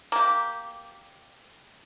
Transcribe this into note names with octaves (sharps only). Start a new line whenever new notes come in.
A#3 G4